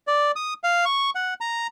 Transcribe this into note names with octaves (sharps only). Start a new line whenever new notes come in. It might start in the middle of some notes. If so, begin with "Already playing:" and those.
D5
D#6
F5
C#6
F#5
A#5